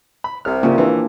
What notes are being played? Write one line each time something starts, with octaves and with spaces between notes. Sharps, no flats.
B5
C2 C3 F6
C#3 A#3 F4
E3 D4